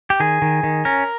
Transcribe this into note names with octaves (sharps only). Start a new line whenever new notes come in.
G4
D#3 G#4
D#3
D#3
C#4 A#4